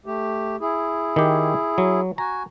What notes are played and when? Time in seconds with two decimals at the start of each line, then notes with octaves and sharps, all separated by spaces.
0.06 A3 G4
0.61 E4 G#4
1.16 D#3 G4
1.78 F#3
2.18 F#4 G#5 A#5